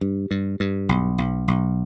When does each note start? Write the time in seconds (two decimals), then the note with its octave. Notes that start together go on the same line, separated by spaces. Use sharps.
0.01 G2
0.31 G2
0.60 G2
0.89 B1
1.18 B1
1.48 B1